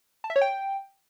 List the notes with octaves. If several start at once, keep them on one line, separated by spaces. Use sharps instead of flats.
A5
E5
C#5
G5